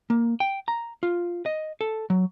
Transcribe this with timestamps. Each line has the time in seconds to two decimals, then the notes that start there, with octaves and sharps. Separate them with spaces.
0.10 A#3
0.40 G5
0.68 A#5
1.03 F4
1.46 D#5
1.81 A4
2.10 F#3